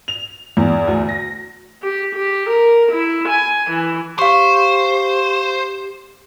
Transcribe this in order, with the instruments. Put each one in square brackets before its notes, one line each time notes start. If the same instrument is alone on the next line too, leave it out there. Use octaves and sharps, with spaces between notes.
[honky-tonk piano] F7
E2
D2
A#6
[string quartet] G4
G4
A#4
E4
G#5
E3
[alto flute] G4 [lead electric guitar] C5 [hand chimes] F5 C#6